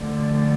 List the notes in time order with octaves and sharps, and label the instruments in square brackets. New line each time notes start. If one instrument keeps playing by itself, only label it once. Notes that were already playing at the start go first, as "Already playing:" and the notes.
Already playing: [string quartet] D2 D3 F3